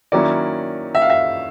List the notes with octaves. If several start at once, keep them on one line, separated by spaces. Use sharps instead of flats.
D#3 F#3 A#3 C#4 E4 D5
E5
F5
E5